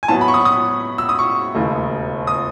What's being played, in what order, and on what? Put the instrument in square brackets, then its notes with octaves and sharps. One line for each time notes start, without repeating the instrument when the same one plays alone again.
[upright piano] G#5
A2 F#3 B3 A5
B5
C#6
D#6
D#6
E6
D#6
C#6
E1 D#2 C#3 E3 A3
D#6